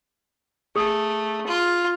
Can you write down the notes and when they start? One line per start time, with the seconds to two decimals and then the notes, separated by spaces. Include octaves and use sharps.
0.76 A3 G#4 D#6
1.46 F4